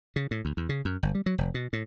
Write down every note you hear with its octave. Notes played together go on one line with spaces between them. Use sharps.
C#3
A2
D2
E2
C#3
F#2
G1
G3
F#3
F1
B2
A2